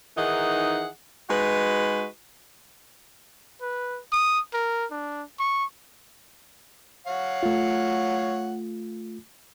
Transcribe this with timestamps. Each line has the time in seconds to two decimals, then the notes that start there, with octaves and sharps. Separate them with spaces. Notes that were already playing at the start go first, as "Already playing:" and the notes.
0.17 D#3 E3 D#4 G#4 F#5
1.30 G#3 D#4 F#4 B4
3.62 B4
4.12 D#6
4.54 A#4
4.91 D4
5.39 C#6
7.07 C#5 F5 F#5
7.43 A3 F4